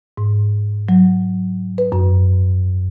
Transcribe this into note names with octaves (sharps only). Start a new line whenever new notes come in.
G#2
F#3
B4
F#2